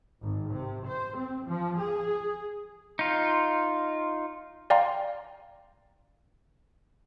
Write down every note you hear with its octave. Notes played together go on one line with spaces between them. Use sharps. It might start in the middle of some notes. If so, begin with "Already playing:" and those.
G#1
C3
C5
C4
F3
G#4
D#4 F4
D5 F5 G5 G#5 A#5 C6